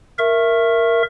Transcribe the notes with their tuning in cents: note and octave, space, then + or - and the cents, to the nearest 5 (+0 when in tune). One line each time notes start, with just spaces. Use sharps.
A#4 +0 E5 +15 C#6 -20